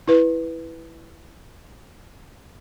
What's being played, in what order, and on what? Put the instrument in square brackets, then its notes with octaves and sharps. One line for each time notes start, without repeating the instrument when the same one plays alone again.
[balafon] E4 B4